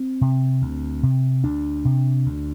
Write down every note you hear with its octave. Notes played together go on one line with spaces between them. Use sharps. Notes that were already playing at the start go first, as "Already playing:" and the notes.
Already playing: C4
C3
D2
C3
D2 D4
C3
D2